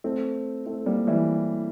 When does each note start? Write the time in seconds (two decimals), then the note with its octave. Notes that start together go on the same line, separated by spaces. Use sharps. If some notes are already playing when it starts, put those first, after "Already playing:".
0.04 A3 C4
0.66 A3 C4
0.86 G3 A#3
1.07 E3 G3